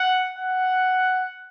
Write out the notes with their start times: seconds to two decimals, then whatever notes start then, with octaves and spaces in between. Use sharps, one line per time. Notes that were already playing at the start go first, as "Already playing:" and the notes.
Already playing: F#5
0.39 F#5